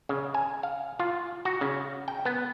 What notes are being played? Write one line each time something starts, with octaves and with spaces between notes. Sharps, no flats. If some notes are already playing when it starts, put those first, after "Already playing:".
C#3
G#5
F5
F4
F#4
C#3
G5
B3